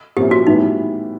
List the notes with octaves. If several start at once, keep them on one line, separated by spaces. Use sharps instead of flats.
A#2 F3 A#3 C#4 E4 G4
F#4
A2 E3 G3 B3 D#4